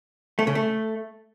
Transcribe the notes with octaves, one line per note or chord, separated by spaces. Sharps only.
A3
C#3
A3